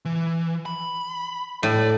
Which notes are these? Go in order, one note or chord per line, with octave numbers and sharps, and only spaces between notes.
E3
B5
A2 D5